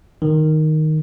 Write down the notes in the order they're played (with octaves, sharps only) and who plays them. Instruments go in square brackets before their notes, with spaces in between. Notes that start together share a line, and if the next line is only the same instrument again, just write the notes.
[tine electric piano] D#3